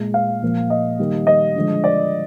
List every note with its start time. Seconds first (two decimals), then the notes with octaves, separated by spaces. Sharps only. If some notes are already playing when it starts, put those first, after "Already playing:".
Already playing: A#2 G#3
0.14 F5
0.42 A#2 F3 A#3
0.70 D#5
0.99 D#3 G3 A#3
1.27 D#5
1.55 D3 F3 G#3
1.84 D5